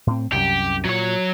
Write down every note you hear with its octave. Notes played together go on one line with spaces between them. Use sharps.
A2 C4
C2 F#2 G4
A#2 F#3 C#5